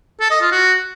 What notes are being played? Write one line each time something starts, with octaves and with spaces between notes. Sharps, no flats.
A4
D#5
F4
F#4